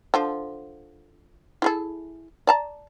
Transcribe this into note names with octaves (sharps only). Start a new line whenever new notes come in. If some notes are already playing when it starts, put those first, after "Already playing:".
D3 F3
E4 G#4 A4
D5 A5 A#5